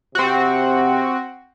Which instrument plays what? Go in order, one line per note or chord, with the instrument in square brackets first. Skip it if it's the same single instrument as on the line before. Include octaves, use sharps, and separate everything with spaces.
[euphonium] C3 [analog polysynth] C4 F#4